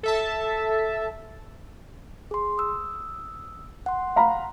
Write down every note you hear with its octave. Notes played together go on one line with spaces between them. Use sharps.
A4 E5 A5
G#4 C6
D#6 E6
F#5 C6
F5 A#5 B5